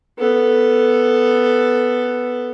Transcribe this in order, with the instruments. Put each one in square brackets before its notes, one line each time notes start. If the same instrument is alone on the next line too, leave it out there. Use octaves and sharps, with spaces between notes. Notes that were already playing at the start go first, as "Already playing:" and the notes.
[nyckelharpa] B3 A4